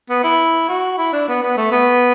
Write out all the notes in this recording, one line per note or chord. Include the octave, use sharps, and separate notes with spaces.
B3
E4
F#4
E4
D4
B3
B3
A3
B3